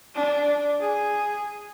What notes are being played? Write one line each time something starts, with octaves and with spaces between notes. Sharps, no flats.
D4
G#4